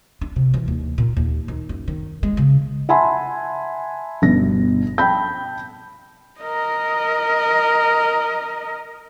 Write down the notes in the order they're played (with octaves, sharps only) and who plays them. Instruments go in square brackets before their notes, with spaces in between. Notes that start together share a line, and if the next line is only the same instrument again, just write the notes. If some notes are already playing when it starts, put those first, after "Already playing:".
[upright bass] D4
C3
E3
D#2
A#2
D#2
D#3
F#2
D#3
G#3
C#3
[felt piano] E5 F#5 G#5 A5 B5 C6
G1 B2 A#6
G5 A5 B5 G6
[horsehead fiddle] A#4 D#5